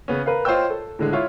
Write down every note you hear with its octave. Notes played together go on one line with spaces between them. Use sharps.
C#3 B3 C#4
A#4 B4 F5
F4 C5 C#5 D#5 G5 E6
A4
A2 D3 G#3
E4 F4 C#5